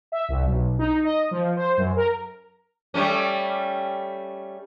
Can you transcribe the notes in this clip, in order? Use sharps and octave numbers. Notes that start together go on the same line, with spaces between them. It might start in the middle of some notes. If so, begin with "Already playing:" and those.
E5
C2
B1
D#4
D#5
F3
C5
F#2
A#4
G3 A3 C#4